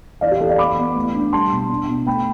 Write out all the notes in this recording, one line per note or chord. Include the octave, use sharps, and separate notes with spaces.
E3 D5 F5
G4
E3 A4
D5 F5
B3 B5 D6
B3
A3
D4
G3 A5 C6
B2
D4
B2
A3 G5 B5